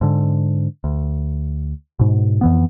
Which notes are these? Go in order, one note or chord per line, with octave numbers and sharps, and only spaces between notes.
G#2 D3
D2
G#2 B2
F2 E3 B3